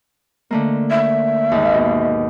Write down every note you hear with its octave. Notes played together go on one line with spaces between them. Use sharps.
D3 A3 A#3
E5
D#2 G#2
B2